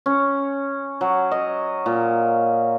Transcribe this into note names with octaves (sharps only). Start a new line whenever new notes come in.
C#4
F#3
D#5
A#2